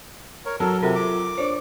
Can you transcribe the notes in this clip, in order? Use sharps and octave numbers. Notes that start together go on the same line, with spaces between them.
A#4 C#5
F#3 A4 A#4
C3 F4 A4 A#4
D6
D4 C5 C#5